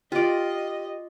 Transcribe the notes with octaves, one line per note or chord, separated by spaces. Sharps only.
F4 G4 D5 D#5